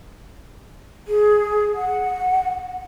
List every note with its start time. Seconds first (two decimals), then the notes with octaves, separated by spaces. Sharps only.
1.08 G#4
1.75 F#5